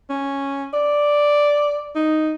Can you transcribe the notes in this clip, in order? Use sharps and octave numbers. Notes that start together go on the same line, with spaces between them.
C#4
D5
D#4